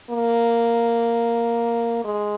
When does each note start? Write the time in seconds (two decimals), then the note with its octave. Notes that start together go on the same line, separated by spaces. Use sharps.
0.10 A#3
2.05 G#3